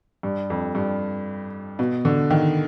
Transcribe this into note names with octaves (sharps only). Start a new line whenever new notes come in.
G2
F2
G2
B2
D3
D#3